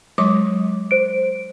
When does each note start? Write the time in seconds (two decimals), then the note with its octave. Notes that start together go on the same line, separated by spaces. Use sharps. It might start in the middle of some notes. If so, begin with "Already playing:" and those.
0.18 F#3 G#3 D6
0.91 C5 D7